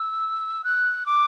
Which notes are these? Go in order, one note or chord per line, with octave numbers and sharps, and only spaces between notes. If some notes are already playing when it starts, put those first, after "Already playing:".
Already playing: E6
F#6
D6